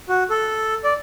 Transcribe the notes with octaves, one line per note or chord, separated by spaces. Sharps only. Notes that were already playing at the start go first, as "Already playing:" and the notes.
F#4
A4
D5